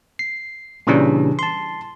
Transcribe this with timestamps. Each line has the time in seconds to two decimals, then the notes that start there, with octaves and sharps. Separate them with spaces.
0.19 C7
0.87 A#2 C#3 E3 G3 C#4 D4
1.39 A5 C6